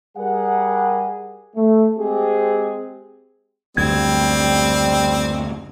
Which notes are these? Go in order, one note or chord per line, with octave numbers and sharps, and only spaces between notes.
G3 G#4 A#4 F#5
A3
G#3 C4 G4 G#4
F#1 D2 G3 C4 G#6